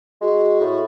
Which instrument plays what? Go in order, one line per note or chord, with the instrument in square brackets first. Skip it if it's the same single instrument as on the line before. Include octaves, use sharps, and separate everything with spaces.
[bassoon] G#3 [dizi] F#4
[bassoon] A2